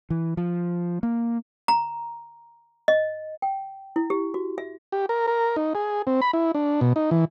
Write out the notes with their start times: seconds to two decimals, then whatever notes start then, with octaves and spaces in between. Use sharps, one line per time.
0.10 E3
0.37 F3
1.03 A#3
1.68 A#5
2.88 D#5
3.42 G5
3.96 E4
4.10 G4
4.34 F#4
4.58 E5
4.92 G4
5.09 A#4
5.27 A#4
5.56 D#4
5.75 G#4
6.07 C4
6.22 B5
6.33 E4
6.55 D4
6.81 B2
6.96 D#4
7.11 E3